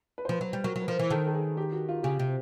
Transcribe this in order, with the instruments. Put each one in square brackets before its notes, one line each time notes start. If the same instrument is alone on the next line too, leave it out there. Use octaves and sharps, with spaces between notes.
[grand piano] B4
C5
[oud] F3 [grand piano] B4
[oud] F#3 [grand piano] B4
[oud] G3
[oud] F#3 [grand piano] A#4
[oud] F#3
[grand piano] B4
[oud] F3 [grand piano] A#4
[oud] E3
[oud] D#3 [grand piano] A4
[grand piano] A4
G#4
G4
F#4
F4
[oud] C#3 [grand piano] G4
[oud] C3